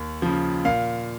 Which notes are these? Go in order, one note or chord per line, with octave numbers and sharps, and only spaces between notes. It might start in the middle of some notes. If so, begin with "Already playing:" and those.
Already playing: D#2
C#3 F3
A#2 F5